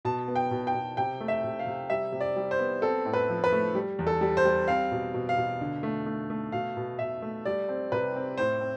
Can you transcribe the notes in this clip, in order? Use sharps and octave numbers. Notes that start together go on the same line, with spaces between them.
B2 A5
B3
G5
B2
G5
B2
C3 G5
A3
E5
C3
F5
C3
G3 E5
C3
D5
G3
C5
B3
C4 A4
A2
B4
F3
B4
A3
G3
E2
A4
G3
C5
G3
C4 F5
B2
B2
F5
B2
D3
A3
A3
A3
B2 F5
B2
B2 E5
A3
G3 D5
C4
C3 B4
C4
A2 C5
C4